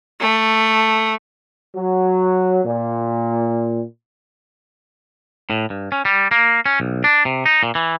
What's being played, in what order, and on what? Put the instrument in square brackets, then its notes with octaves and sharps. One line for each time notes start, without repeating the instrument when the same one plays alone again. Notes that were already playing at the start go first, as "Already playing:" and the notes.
[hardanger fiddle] A3
[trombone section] F#3
A#2
[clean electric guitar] A2
G2
C#4
G3
A#3
C#4
B1
D4
C3
D#4
A#2
E3